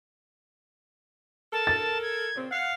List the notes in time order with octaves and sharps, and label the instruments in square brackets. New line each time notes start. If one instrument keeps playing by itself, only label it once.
[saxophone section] A4 A#4 [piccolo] A5
[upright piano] A6
[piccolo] G#6
[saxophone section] A#2 C#3 C4
[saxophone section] F5 F#5 [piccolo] C7